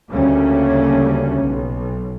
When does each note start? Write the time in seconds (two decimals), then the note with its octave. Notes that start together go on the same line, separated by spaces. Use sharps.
0.10 D2 C#3 G3 A3 A#3 C#4
1.45 B1